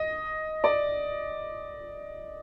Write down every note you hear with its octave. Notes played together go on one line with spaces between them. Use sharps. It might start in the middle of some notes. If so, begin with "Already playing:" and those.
Already playing: D#5
D5